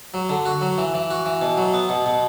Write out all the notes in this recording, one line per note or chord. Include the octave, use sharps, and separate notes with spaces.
F#3
D3
F#4
F#3
E3
E3
F#4
E3
B2
F#3
B3
B2
B2